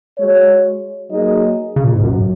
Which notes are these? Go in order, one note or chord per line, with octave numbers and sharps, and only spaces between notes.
G#3 F#4 C#5
F#3 A#3 D#4 G#4 D#5
C#3
A#2
G#2
F#2 F#3